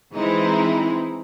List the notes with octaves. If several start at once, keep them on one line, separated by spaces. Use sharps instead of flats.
E3 G#3 C4 D#4 E4